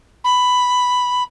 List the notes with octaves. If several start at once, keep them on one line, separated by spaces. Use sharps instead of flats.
B5